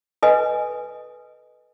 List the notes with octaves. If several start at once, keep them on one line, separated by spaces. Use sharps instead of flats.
A4 B4 D#5 G#5